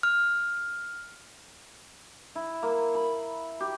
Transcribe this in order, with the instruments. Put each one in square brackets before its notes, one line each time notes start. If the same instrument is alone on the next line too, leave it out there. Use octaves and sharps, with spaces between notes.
[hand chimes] F6
[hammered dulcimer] E4
A#3
B5
G4